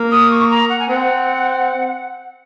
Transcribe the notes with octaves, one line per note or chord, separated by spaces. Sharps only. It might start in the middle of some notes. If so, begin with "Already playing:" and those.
Already playing: A#3
D#6
C#6
A#5
F#5
G#5
C4 F#5